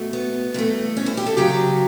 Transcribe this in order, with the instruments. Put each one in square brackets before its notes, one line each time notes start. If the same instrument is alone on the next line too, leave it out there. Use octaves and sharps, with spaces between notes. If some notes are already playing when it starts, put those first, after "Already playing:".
Already playing: [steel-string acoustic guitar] B2 A3
B3
G2 E3 A3
C#4
E4
G4
A4
F#2 C#3 F#3 G4